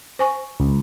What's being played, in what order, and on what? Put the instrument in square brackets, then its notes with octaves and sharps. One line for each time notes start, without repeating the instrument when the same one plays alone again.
[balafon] C5 G#5 C#6
[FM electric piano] C#2